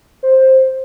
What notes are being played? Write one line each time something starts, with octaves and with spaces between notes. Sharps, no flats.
C5